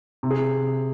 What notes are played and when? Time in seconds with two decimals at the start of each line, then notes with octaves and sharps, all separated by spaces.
0.23 C3
0.31 G#4